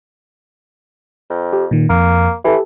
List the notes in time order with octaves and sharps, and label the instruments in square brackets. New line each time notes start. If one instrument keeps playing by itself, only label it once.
[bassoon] F2
[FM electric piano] G4
A#2 D#3
[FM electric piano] F2 [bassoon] A#3
[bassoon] E3 [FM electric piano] G4 A4